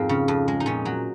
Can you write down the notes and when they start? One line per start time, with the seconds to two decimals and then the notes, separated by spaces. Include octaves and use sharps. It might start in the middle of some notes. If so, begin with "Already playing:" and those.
Already playing: F2 G#2 F3 A#3 C4
0.09 C#3
0.28 F2
0.48 G#3
0.60 D#4
0.66 A#2 C#4
0.85 F#3